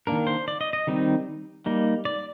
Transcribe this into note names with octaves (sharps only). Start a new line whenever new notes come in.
D#3 A#3 D4 A#4
C5
D5
D#5
D#5
D#3 G3 C4 D#4
G3 A#3 D#4
D5